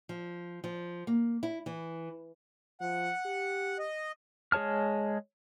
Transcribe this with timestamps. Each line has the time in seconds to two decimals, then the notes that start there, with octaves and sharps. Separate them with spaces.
0.09 F3
0.64 F3
1.07 A#3
1.43 E4
1.66 E3
2.81 F3 F#5
3.26 G4
3.79 D#5
4.52 G#3 G#4 C#5 A5 F6